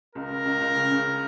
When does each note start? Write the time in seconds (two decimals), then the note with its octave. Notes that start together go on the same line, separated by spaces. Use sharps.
0.15 C#2 A#4
0.30 C#2
0.45 C#2
0.61 C#2
0.76 C#3
0.91 C#3